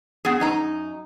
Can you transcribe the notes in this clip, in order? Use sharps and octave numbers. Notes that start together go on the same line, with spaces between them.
B3 G#4
F#2 D#4 A#5